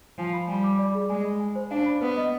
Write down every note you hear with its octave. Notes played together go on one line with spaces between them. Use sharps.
F3 G#5
B5
G3 G#5
D6
D5
G#4
G#3 G#5
B5
G#5
C5
D4 F5
B5
B3 B4
D#5